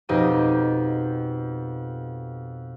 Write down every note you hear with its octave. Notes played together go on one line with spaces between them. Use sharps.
F2 B2 D#4 G4 D#7